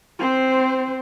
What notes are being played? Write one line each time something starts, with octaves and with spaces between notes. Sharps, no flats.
C4 C5